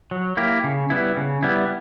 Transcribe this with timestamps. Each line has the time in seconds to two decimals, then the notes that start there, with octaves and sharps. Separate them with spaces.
0.11 F#3
0.37 A#3 E4 G4
0.64 C#3
0.90 G3 B3 E4
1.17 C#3
1.43 G3 B3 E4